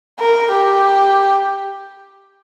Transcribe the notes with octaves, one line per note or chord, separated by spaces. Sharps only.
A#4
G4